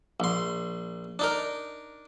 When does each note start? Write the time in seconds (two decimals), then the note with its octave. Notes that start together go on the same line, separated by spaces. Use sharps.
0.20 A#1 C6
1.19 D4 D#4 A#4